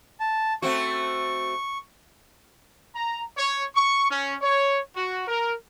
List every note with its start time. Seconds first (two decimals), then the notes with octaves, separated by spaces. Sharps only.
0.20 A5
0.62 A3 C4 F#4 C#6
2.95 A#5
3.37 C#5
3.76 C#6
4.10 C#4
4.41 C#5
4.95 F#4
5.27 A#4